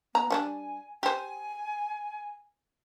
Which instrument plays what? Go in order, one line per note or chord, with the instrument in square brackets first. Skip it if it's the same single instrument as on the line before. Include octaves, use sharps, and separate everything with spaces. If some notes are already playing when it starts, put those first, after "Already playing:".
[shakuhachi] B3 [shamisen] A#5
[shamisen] G3 C#4 D4 [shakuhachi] G#5
[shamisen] G4 C5 [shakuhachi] G#5